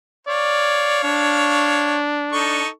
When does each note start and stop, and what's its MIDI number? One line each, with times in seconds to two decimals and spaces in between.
0.27 2.00 73
0.27 1.01 74
0.27 2.00 77
1.03 2.62 62
2.33 2.68 63
2.33 2.68 69
2.33 2.68 85